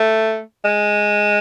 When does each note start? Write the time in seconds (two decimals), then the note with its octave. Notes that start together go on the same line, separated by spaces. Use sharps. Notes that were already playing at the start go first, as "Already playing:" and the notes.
Already playing: A3
0.65 G#3